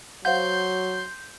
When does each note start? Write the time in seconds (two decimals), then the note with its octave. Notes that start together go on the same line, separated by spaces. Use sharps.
0.25 F#3 C5 F5 F#5 C6 G6